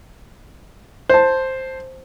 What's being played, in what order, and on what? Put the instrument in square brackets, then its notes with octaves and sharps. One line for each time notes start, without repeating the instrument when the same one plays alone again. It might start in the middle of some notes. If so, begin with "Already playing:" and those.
[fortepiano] C5 A5